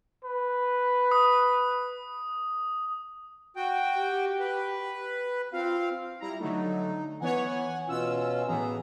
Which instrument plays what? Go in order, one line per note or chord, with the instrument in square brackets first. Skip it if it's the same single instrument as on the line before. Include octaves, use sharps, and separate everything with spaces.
[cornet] B4
[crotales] D#6
[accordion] F#4 G5
[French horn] G4
[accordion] B4
[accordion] C4 F5 [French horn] F4
[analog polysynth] G3 A#5 [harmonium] E4
[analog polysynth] D3 F#3 A3 [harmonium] D#4
[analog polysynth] E3 B3 C#5 [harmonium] F#5 G#5
[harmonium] B2 C#4 F4 [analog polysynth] E6
[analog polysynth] A2 E3 B3 [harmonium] G#4 A#5